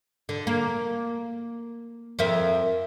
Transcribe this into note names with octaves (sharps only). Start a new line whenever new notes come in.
D3
A#3
F2 A#4 E5